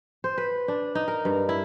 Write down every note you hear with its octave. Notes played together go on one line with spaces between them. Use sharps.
C5
B4
D4
D#4
A#4
G2
E4